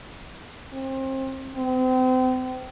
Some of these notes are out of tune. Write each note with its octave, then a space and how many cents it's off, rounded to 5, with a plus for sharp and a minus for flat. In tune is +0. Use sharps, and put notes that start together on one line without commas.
C4 +30
C4 -35